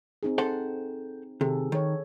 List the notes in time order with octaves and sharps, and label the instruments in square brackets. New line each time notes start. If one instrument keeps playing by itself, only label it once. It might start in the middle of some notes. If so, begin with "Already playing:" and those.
[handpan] C4 D#4 G#4
[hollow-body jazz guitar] A4 C5 F#5
[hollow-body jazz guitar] C3 [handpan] D#3 G#4 A4
[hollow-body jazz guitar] D#3 [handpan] A4 C#5